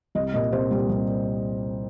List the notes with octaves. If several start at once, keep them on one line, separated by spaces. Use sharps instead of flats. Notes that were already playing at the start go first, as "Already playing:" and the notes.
C2 D#5
A#2 G3 D#5
C2 C5
A#2 G3
C2